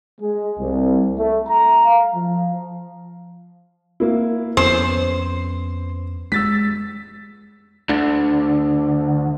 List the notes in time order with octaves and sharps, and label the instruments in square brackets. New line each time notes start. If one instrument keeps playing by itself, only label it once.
[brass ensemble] G#3
C2
A3
A#5
F5
F3
[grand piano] A#3 E4
[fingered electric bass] F2 C#4 [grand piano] B3 [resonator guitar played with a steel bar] C5
[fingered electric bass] G#3 [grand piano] E6 A6 B6
[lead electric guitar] D2 D3